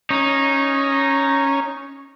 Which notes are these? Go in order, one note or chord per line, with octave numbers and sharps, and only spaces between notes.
C#4 D#4